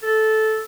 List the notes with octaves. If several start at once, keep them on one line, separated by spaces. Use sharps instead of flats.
A4